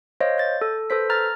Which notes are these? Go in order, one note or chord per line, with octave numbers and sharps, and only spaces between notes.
C5 C#5 D#5 F5
G6 A6
A4
A4 B4 C5 B6
A#5 F6 A6 A#6